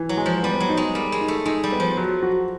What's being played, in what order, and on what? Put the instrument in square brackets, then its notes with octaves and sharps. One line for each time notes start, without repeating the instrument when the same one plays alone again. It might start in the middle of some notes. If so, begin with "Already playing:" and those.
Already playing: [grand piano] E3
[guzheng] F#3
[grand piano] G#3
[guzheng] F3
[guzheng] G3 [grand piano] B3
[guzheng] F#3
[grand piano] D#4
[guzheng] G#3
[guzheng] G3 [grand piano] A#4
[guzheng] G#3
[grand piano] D#4
[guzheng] A3
[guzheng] G#3 [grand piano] D#4
[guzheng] G3
[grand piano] B3
[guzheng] F3
[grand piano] F#3
F#4